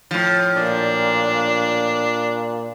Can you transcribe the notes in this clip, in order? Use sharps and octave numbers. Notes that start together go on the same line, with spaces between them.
A2 F3
A#2 D4